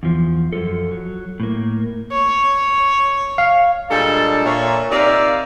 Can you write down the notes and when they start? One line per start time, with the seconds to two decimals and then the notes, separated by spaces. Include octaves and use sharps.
0.03 E2 F3
0.53 F#2 C#3 F3 A4
0.92 F#3
1.40 A2 A#3
2.12 C#5
3.38 F5
3.90 G2 A#2 G#3 A4 D5 A5
4.45 A#2 C#5 E5
4.90 C3 D#4 A#4 D5 E5 F5